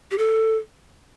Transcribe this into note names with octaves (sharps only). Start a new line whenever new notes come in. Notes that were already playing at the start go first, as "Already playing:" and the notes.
G4
A4